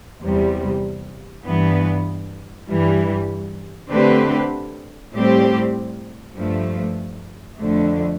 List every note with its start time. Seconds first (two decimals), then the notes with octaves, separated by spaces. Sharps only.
0.22 E2 C3 G3
1.44 G2 E3 B3
2.67 G2 E3 G3
3.90 D3 A3 C4 G4 B4
5.13 A2 G3 C4 G4
6.35 G2 F3 A3
7.58 F2 D3 A3